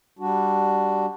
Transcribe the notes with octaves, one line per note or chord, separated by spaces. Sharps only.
G3 D4 F#4